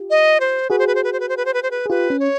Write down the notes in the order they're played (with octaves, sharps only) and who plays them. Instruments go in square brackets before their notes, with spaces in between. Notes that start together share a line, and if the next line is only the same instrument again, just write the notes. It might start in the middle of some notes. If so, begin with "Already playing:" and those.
Already playing: [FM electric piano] F4 G4
[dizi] D#5
C5
[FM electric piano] F#4 G#4 [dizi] B4
[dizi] C5
B4
C5
B4
C5
B4
C5
B4
C5
B4
C5
B4
[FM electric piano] G#4
[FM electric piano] F4 G4 [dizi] B4
[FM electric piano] C#4
[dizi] C#5